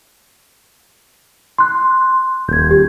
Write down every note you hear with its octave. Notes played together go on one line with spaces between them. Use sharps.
C6 F#6
D#1 G6 G#6
G4